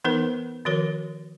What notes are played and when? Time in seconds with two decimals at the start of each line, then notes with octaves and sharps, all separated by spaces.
0.04 E3 B3 D#4 A#4 B4
0.65 D#3 F3 F#4 A#4 C#5